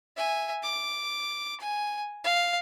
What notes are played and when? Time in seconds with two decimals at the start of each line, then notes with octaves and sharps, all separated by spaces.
0.17 E5 G#5
0.63 D6
1.60 G#5
2.24 F5